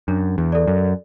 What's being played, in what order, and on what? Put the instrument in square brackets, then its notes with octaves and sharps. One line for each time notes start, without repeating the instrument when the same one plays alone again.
[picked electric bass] F#2 [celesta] D4
[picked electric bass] E2
[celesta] A4 D5
[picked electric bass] F#2